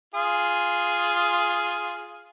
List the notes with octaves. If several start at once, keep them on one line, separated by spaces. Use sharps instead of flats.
F4 G#4